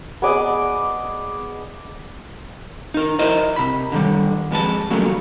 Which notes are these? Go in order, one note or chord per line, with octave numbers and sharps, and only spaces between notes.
B3 G#4 D5 D#5
D#4 A#4
E4 A#4 C5 D#5
C3 B5
D3 D#3 G3
F2 G#3 B4 A5
E2 C#3 F#3 G3 A3 A#3